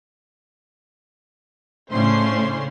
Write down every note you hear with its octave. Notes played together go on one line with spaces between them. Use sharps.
A2 C#3 C#4 D4 C5 C6